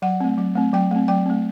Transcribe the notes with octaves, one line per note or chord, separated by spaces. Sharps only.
F#3 F#5
A3 C4
F#3
A3 C4
F#3 G5
A3 C4
F#3 G5
A3 C4